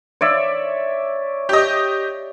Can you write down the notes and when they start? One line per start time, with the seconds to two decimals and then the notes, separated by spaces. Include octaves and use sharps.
0.21 C#5 D5 E5
1.49 G4 D#5